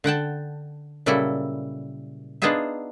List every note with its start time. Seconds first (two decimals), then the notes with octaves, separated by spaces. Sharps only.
0.04 D3 F#5 G5 A5
1.06 A#2 C#3 F#3 G3 E4 A4
2.42 B3 D4 D#4 F4 G#4 E5